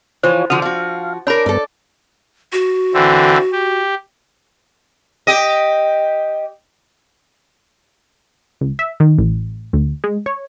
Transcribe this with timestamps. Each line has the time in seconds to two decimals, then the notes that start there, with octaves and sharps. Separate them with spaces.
0.23 E3 F3 F4 C5 C#5
0.50 D3 F3 F#4 D#6 F6
0.62 F3 F#4 F5
1.27 D4 A#4 C#5 B5
1.46 G2 B3 A4 A#4 D5
2.53 F#4
2.94 D3 E3 C4
3.53 G4
5.27 G4 D#5
8.61 C#2
8.79 E5
9.00 D#3
9.18 A1
9.73 D2
10.04 G#3
10.26 C#5